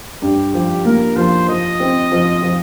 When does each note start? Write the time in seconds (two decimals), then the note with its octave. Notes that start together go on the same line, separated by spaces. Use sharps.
0.22 G2 G4
0.54 F3 G4
0.85 A#3 A#4
1.16 F3 C5
1.48 F3 D#5
1.80 C4
2.12 F3
2.42 F3